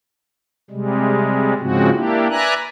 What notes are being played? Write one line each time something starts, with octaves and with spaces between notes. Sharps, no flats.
C3 G3 G#3
G#2 C#3 F3 G#3 C4 F#4
A#3 D4 E4 G4
B4 D5 E5 G#5 A#5 F#6